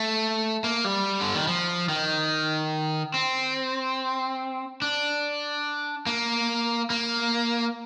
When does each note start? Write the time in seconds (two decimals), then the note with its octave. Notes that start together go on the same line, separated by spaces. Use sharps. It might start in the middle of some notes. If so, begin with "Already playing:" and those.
Already playing: A3
0.64 A#3
0.85 G3
1.21 D3
1.35 D#3
1.48 F3
1.89 D#3
3.14 C4
4.82 D4
6.07 A#3
6.90 A#3